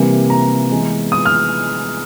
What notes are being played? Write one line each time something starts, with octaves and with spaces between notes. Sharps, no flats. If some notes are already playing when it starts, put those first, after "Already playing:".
Already playing: C3 E3 G3 A#3
A#5
E3 G#3 B3
D#6
F6